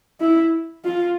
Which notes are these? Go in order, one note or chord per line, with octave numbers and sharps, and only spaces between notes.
E4
F4